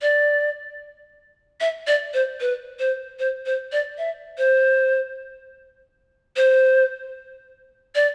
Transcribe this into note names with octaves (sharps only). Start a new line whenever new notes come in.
D5
E5
D5
C5
B4
C5
C5
C5
D5
E5
C5
C5
D5